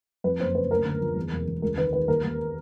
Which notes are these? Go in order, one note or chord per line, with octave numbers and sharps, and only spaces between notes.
F2 B4
F#1 C5
C#3 B4
D2 A#4
D3
F3
E2
E1
E1
C#2 A#4
D#3 B4
D#3 B4
D#2 A#4
D#2